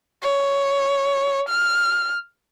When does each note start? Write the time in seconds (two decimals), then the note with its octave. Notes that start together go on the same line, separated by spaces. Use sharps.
0.23 C#5
1.49 F6